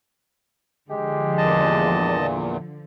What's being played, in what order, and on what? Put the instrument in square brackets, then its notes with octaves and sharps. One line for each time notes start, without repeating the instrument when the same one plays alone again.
[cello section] D3 F3 [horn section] G#3 G4
[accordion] E2 A#2 [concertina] D#5 A5